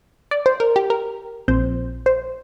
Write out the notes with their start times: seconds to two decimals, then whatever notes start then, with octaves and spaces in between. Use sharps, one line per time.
0.31 D5
0.46 C5
0.60 A#4
0.76 G4
0.90 A#4
1.48 A#1 A#2 F3 C4 C5
2.06 C5